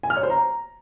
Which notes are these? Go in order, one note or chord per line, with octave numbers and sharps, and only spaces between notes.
G#5
F6
C#5
C5
A#5